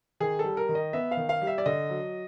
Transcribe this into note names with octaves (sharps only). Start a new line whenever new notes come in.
D#3 G#4
A4
G3
A#4
D#3
D#5
B3 E5
F5
D#3
F5
G3
E5
D5
D3 D#5
F#3